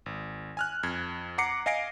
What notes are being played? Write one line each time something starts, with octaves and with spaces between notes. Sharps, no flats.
G#1
G#5 F6 F#6
F2 G#6
F#5 A#5 D6 C7 C#7
D#5 F5 G#5 A#6 C7 D7